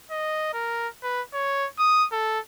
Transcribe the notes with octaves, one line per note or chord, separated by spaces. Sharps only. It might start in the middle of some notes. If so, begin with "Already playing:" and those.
D#5
A#4
B4
C#5
D#6
A4